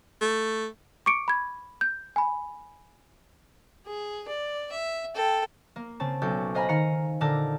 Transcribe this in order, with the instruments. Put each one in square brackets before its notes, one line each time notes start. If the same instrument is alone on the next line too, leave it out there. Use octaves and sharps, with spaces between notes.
[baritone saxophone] A3
[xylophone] C#6 D6 C#7 D7
B5 G#6
G6
G#5 B5
[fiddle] G#4
D5
E5
A4 G5
[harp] A#3
C#3 C4 A5
B1 C#4 A4 G6
C5 D#5 F5 G#5 A#5 B5
D#3 F5 A#5 C#7
A#2 D3 A4 A#4 A5 G6